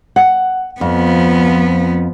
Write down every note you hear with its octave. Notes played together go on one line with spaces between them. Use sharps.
F#5
F2 F3 B3